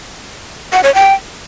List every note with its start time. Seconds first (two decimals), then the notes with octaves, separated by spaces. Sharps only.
0.73 F#5
0.84 C#5
0.95 G5